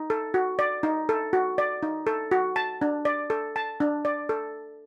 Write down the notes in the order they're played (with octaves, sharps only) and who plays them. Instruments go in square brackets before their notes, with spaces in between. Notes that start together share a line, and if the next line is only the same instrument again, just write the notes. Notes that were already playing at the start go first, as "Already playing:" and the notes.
Already playing: [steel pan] D#4
A4
F#4
D5
D#4
A4
F#4
D5
D#4
A4
F#4
A5
D4
D5
A4
A5
D4
D5
A4